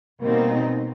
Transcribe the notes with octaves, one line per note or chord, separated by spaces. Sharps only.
B2 G3 A#3 C4 D#4